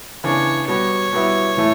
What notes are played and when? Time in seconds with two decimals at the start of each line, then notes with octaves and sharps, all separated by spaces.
0.24 C#3 E3 B3 D4 C#5
0.68 B2 G3 B3 C#5
1.13 B2 G3 B3 E4
1.57 A2 E3 A3